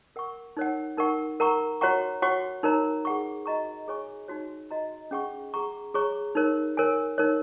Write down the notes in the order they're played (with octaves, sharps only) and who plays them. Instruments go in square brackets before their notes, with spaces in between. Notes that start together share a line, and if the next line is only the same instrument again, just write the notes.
[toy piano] A#4 F#5 C#6
D#4 A#4 C#5 F#5
D#4 A#4 F#5 C#6
A#4 F#5 A#5 C#6
F#4 C#5 F#5 A#5 C#6
F#4 C#5 F#5 C#6
D#4 A#4 C#5 A#5
G#4 F#5 C#6
F#4 D#5 A#5 C#6
G#4 C#5 G#5 C#6
D#4 F#4 C#5
F#4 D#5 A#5
C#4 G#4 F#5 C#6
G#4 F#5 A#5 C#6
G#4 C#5 A#5 C#6
D#4 A#4 C#5
A#4 C#5 G#5
D#4 A#4 C#5